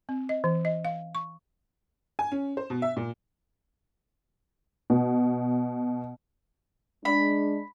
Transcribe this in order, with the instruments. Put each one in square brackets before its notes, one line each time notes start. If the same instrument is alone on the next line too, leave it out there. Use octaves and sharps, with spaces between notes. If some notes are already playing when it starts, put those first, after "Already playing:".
[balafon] C4
D#5
E3
D#5
F5
C#6
[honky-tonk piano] G#5
C#4
C5
B2
E5
A#2
B2
[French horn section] G#3 D4 [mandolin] B5